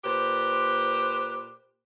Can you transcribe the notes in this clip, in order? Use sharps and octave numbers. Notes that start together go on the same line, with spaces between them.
A#2 G4 B4 C5